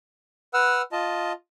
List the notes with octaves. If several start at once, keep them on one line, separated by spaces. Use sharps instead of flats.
B4 F#5 E6 F6
F4 D#5 A5